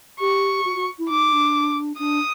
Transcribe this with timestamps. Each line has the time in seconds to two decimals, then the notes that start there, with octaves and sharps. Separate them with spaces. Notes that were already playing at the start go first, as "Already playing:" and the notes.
0.20 G4 C#6
0.65 F#4
0.76 F#4
0.99 E4
1.09 D#4 D6
1.32 D4
1.99 D4 D#6